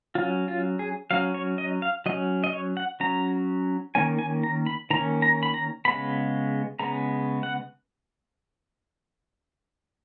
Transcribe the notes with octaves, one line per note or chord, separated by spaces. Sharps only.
F#3 C#4 F4
F4
G#4
F#3 C#4 F5
C#5
D#5
F5
F#3 C#4 D#5
D#5
C#5
F#5
F#3 C#4 A#5
D#3 A#3 C#4 G#5
G#5
A#5
B5
D#3 A#3 C#4 A#5
A#5
B5
A#5
C#3 G#3 B3 B5
C#3 G#3 B3 A#5
F#5